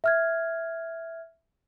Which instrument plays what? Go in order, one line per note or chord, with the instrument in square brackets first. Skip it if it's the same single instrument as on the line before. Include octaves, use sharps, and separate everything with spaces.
[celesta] E5 F6 G#6